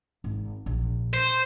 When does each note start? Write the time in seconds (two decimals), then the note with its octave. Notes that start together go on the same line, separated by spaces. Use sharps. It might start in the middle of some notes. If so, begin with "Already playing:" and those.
0.24 G#1
0.66 A#1
1.13 C5